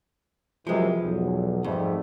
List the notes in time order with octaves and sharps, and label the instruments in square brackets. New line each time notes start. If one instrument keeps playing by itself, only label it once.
[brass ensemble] F#2 C3 E3 [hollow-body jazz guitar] F3 G#3
[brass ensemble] B1 E2
[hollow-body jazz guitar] F2 [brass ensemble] G#2 G3 A3